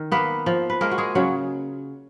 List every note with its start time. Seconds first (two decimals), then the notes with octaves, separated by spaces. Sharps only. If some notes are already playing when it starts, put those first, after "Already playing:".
Already playing: D#3
0.12 A#3 B3 B4
0.46 F3
0.70 B4
0.81 G#3 A#3 A#4
0.91 F#4
0.98 G#3 G#4
1.15 C#3 F#3 F#4